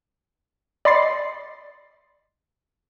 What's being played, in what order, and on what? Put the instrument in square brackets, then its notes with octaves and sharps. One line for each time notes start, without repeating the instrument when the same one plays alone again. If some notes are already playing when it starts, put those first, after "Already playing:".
[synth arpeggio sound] D5 D#5 B5 C6 A6 C7